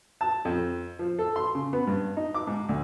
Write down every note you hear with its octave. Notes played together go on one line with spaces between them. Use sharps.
A5
F2
F3
A4
C6
C#3
B3
G2
D#4
D6
G#2
D2